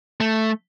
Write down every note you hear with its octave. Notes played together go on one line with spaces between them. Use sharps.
A3